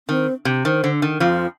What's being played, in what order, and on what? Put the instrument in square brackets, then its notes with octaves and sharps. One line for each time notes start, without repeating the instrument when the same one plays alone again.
[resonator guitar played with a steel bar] D#3 [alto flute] C4
[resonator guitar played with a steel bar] C3
[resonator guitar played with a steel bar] D#3 [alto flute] C5
[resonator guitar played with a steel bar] D3
D#3
[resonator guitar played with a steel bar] F2 F3 [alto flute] F4